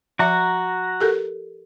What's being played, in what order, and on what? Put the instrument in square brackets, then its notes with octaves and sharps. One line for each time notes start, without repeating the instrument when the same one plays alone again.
[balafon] F3 E5 [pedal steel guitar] F#4 A#5
[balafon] G4 A4 A#4